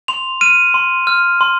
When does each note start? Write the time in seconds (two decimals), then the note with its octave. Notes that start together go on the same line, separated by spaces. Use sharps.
0.08 C6 F7
0.41 F6 D#7
0.74 C6
1.07 F6
1.41 C6